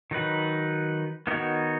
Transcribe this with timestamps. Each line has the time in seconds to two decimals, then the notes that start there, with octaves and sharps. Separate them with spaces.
0.11 D#3 F#3 D#4 B4
1.27 D#3 B3 D#4 F#4 C#5